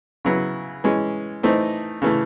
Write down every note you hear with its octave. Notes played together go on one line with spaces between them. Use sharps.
C#3 F#3 B3 E4
E3 G#3 C#4
E3 A3 C4 D#4
C#3 E3 A3